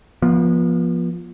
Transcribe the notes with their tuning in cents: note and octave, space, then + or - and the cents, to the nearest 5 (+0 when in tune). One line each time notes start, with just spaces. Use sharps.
F3 +0 B3 -35